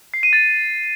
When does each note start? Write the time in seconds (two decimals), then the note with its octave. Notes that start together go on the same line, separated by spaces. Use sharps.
0.14 C7
0.23 D#7
0.33 A6